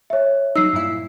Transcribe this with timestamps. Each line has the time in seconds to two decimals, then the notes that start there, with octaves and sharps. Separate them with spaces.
0.10 C#5 E5
0.56 F#3 D#4 E6 C7
0.73 G2 A#2 E4